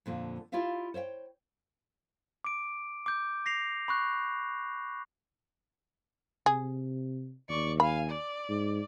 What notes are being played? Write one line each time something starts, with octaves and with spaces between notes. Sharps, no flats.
F2 A#2 D3
E4 F4 G4 D5 E5 F5
C5 C#5 E5 G5
D6 D7
D6 G6
A#6 C7 F7
B5 C#6 F#6
C3 G#4
D#2 D5 C#6
F5 G#5 B5
D5
G#2